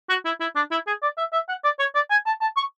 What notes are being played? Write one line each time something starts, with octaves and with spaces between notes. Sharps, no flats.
F#4
E4
E4
D4
E4
G#4
D5
E5
E5
F#5
D5
C#5
D5
G#5
A5
A5
C#6